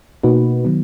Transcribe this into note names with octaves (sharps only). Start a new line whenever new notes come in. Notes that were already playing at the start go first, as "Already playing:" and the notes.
B2 A#3 D#4 F#4 B4
D#3 F#3 B3